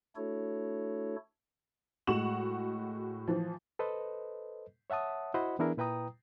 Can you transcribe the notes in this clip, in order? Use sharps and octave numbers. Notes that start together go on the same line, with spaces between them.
A3 D4 E4 F#4 A4 C#5
A2 G#3 F#4 C#6 E7 F#7
E3 F3
A4 B4 C5 D#5
C#5 E5 F#5 A5 D#6
E4 F#4 C5 D#5 F#5 B5
E3 B3 D4 E4 G#4 A#4
A#2 E4 B4 G5 A#5 D#6